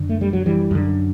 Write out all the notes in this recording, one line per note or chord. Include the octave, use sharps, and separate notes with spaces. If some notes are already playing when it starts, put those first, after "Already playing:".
Already playing: F#2 D3
A3
G3
F#3
E3 G3
F#2 D3